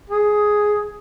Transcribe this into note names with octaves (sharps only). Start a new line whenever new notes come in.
G#4